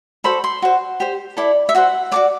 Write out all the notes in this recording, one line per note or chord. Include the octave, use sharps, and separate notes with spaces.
F#4 A4 C5 B5
C6
F#4 C5
G4 C5
E4 A4 D5 B5
E5
F#4 C5 F#5
F#4 A4 D5 D6